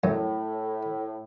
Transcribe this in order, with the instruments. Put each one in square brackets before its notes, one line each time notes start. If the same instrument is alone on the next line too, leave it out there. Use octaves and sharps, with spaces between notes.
[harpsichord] F#2 [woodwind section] A2